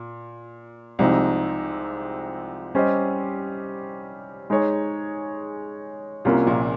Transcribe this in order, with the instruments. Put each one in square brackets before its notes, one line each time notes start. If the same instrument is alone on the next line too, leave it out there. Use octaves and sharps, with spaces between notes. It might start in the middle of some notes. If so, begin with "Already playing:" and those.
Already playing: [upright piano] A#2
[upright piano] C2 C3 [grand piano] F3 G#3 C4 D#4
[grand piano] G3 C#4 G4 C5 D#5
G#3 D#4 G#4 C#5
[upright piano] C2 C3 [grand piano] A#3 C#4 F4
[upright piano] A#1 A#2